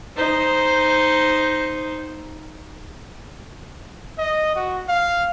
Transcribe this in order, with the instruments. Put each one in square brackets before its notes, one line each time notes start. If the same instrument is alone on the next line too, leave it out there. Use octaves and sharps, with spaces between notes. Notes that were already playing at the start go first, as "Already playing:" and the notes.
[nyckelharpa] D#4 C5
[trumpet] D#5
F#4
F5